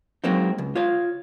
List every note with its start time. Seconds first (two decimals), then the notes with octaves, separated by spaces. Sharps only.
0.24 F#3 G#3 A#3 C4 D#4
0.58 C#2
0.76 F4 C#5 F5